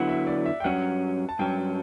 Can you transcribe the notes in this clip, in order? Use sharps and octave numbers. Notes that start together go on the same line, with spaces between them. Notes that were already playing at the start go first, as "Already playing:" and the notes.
Already playing: D3 F#3 B3 E4 F#5
E5
D5
E5
G5
G2 F#3 C#4 F#5
A5
G2 F#3 C#4 G5